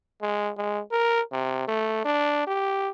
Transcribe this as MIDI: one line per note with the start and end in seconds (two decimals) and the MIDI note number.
0.22 0.51 56
0.57 0.81 56
0.92 1.21 70
1.32 1.63 48
1.68 2.03 57
2.05 2.45 62
2.47 2.89 67